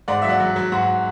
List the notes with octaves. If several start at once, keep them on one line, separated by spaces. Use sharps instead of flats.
G#2 D5 F#5
F#3 E5
D5 F#5
F#3
F#3
G#2 F#4